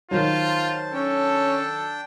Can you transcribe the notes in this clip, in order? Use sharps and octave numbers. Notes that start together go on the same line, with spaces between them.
D#3 F#3 F4 C5 A5
C#4 D4 A4 G5